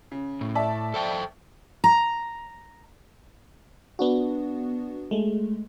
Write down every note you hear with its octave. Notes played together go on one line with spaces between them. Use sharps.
C#3
A2
D5 E5 A5
A4 C5 G5
A#5
B3 D4 F#4
G#3 A3